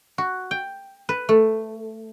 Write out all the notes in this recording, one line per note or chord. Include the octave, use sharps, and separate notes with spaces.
F#4
G5
B4
A3